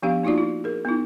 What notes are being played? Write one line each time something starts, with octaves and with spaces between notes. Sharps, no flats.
F3 B3 D4 G4 F5
A#3 D#4 F4 F#4 D5
E4
G#4 A#4
B3 D#4 E4